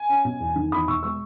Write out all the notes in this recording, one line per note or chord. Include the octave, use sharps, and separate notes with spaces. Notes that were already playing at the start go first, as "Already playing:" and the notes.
Already playing: G#5
C#4
B2
E2
D#3
E2 B5 D#6
B2 C#6 E6
G#3 C#6 E6